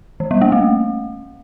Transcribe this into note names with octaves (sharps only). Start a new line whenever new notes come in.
E3
G3
A#3
A3